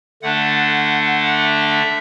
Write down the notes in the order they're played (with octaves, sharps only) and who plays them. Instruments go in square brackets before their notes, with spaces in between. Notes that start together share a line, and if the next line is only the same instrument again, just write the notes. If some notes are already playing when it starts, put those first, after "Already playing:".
[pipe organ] D3 A3 D4 F#5
F#5
E5